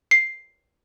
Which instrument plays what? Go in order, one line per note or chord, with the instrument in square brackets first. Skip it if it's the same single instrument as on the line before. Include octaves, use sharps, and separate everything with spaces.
[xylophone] C7